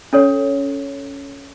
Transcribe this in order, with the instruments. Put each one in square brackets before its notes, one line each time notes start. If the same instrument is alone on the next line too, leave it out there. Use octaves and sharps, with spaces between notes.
[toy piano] C#4 A4 C#5